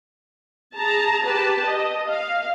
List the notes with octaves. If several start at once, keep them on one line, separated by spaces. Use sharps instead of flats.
G#4 A5 A#5
G4 B4 A5
D#5
F5